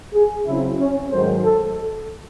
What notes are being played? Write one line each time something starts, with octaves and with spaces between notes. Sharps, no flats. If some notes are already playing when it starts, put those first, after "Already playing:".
G#4
C#3 F#3 C4 E4
C#4
G#2 D#3 F#3 A3 C5
A4